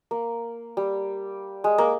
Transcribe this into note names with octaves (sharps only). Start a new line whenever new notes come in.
A#3
G3
G#3
A#3